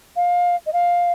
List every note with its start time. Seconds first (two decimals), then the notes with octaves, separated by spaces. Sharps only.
0.16 F5
0.66 D#5
0.73 F5